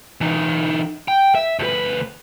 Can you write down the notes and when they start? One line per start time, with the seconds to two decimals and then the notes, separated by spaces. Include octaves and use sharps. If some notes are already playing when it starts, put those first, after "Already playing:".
0.21 E3 D#4
1.08 G5
1.35 E5
1.59 D2 B4